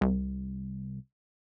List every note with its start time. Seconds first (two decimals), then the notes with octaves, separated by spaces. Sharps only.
0.01 C2